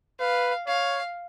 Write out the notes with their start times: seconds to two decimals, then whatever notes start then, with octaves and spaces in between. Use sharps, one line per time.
0.19 B4 F5
0.67 C#5 F5